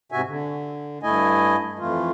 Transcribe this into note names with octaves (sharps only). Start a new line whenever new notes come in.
G#2 C3 F#4 E5 G#5
D3
G2 A3 E4 D#5 G#5
F2 E3 A3 F4